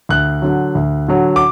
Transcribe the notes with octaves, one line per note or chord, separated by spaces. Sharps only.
D2 F#6
D3 F#3
D2
D3 F#3
D6